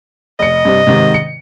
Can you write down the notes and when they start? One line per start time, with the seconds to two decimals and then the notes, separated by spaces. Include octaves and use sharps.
0.39 F1 D#5 C#7
0.65 G2 C3
0.87 G#2 C3 D#3
1.14 C#7